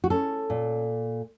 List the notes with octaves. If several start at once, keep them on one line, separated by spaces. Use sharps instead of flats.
F#4
C#4 A4
A#2